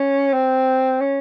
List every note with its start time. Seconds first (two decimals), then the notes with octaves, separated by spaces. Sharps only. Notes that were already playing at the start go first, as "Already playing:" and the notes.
Already playing: C#4
0.33 C4
1.01 C#4